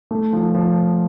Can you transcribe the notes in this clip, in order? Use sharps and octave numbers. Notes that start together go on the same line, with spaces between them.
A3
F3
F3